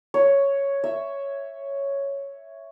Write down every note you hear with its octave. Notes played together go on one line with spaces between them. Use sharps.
C#5
E5